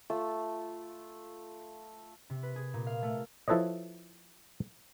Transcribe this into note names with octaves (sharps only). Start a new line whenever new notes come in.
A3 F4 A5 E6
C3
B4
G#4
A#2
F5
A3
F3 E4 A4 B4 C#5 D#5